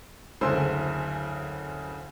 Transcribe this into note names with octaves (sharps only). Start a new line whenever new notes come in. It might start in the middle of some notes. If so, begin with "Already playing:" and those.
F#1 D2 C#3 C5 C6 E6